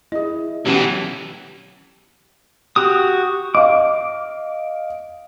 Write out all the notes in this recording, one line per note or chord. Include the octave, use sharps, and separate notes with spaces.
E4 G#4 D#5
B1 E3 C#4 G4 F#5
F#4 G4 D#6
D#5 F5 D6